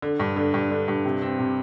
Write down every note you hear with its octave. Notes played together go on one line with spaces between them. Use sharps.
D3
G2
D3
G2
D3
G2
C3
C4
C3